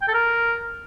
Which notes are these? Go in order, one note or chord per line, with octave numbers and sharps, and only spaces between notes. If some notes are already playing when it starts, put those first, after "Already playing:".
G5
A4
A#4